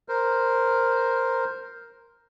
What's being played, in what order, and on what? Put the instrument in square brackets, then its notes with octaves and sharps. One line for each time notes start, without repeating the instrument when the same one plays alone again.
[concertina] A#4 C5